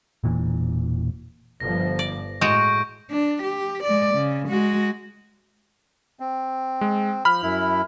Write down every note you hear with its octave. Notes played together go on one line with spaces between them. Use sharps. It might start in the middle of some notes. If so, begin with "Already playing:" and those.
E1 A#2 E3
G1 F3 A#6
D5
A2 G#3 F#4 C#6 G6 D7
D4
G4
G#3 D5
C#3
G#3 F#4
C4
G#3
F3 B5 F6
F#2 E4